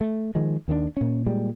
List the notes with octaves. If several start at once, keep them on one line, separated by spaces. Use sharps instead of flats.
A3
D#3 F3 G#3
D#2 D#3 F3 D4
A#2 C#4
A#2 G3 G#3